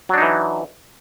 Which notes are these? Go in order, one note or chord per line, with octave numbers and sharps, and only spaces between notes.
E3 F#3 D4 D#4